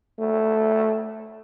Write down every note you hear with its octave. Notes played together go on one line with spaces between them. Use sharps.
A3